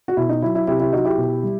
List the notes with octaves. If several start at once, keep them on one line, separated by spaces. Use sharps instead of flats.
F#4
B2 E4
D#4
F#3 E4
E4
C3 E4 G4
E4 G4
F#3 D#4 F#4
E4 G4
B2
G3